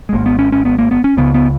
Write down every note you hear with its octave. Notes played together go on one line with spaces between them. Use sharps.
G#3
G#1 G#2 A#3
B3
C#4
C#4
B3
A#3
B3
C#4
C#2 C#3 B3
B3